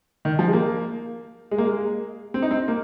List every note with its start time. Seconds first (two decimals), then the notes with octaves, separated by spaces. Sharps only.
0.25 D#3
0.39 F3
0.48 G#3
0.53 A#3
1.51 G#3
1.58 A#3
1.66 G#3
2.34 C4
2.42 D#4
2.51 C4
2.68 A#3